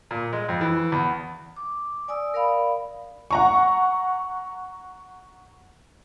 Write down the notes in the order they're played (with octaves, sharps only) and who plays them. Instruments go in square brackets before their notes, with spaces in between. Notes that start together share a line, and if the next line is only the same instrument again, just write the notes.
[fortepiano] A#2
G#3
F2
E3
E2
[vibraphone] D6
D5 G#5 D#6 E6
A#4 D5 F5 B5
[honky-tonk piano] F#5 A#5 C#6